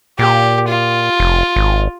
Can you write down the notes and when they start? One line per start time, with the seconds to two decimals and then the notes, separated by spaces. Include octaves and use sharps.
0.19 A#2 G4
0.69 F4
1.20 F1
1.56 G#1